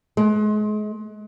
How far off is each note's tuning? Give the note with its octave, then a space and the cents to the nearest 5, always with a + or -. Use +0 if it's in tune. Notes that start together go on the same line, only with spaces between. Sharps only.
G#3 +35